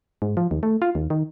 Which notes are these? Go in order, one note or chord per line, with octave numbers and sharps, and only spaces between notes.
G#2
F3
D#2
A3
F4
D#2
D#3